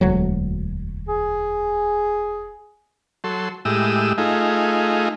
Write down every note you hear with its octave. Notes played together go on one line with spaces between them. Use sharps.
E1 D2 F#3
G#4
F#3 A4 C6
A2 G#3 G4 D#6 E6
A3 D#4 F4 G#4